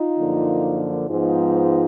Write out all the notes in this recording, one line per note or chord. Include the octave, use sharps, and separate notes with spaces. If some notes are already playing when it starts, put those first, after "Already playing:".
Already playing: D#4 F4
F#2 D3 F3 A#3
G#2 F3 G#3 B3 D#4 F4